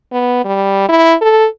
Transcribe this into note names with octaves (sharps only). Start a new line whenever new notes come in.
B3
G3
E4
A4